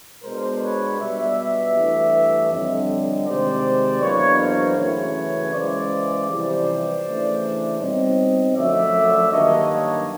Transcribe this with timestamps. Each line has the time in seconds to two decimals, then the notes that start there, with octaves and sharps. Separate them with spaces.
0.23 B2 G#3 B3 D4 A#4 C5
0.61 B4 C#5
0.99 B2 G3 B3 D4 D5 E5
1.75 G2 E3 A3
2.50 F2 D3 G3 C#5 D#5
3.26 C3 D#3 G#3 C5 D5
4.01 E2 B2 F#3 A#3 D4 B4 C#5
4.39 A#4 C5
4.77 F#2 C#3 E3 A3 B4 C#5
5.52 C#3 E3 G#3 C5 D5
6.28 F2 C3 E3 G3 C5 D5
7.04 C#3 E3 A3 D4
7.79 B2 G3 C4 D#4 C#5 D#5
8.54 F#2 D3 F3 A3 D5 E5
9.30 G2 D#3 F#3 A#3 D4 C#5 D#5
9.68 C#5 D#5